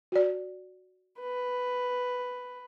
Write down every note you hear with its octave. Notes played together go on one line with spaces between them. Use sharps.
F#4 D5
B4